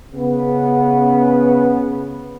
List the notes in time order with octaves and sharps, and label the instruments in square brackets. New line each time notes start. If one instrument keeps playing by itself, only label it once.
[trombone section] C#3 B3